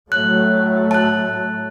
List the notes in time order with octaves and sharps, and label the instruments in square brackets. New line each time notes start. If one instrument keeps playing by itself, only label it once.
[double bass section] A2 F#3 A3 [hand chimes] F#6
[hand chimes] A5 F#6